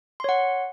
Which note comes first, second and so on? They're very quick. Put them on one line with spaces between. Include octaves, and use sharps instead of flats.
C6 C#5 F#5